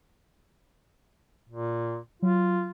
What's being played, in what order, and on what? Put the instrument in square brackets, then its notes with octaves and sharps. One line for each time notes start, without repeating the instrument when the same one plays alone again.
[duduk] A#2
[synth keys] F#3 [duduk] F4